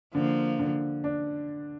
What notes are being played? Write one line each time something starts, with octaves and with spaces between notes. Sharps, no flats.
D3 F3 A#3
D3
D4